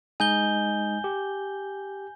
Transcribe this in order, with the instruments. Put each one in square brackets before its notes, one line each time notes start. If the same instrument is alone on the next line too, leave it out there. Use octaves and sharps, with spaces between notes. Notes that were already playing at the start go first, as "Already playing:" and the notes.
[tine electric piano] G#3 D#4 D#5 [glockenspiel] G#5 G6 G7
[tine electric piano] G4